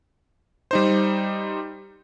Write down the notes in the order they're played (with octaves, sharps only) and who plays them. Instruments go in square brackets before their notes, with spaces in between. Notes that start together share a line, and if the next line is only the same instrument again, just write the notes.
[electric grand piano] G3 D#4 C5